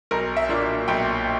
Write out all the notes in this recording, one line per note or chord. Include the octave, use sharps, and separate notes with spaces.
B1 A#4
E5
A#2 A#3 D4
B1 G5